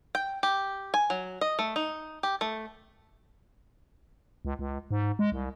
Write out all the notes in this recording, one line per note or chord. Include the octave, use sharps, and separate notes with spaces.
G5
G4
G#5
F#3
D#5
A3
D#4
G4
A3
C#2
C#2
G#2
G#3
C2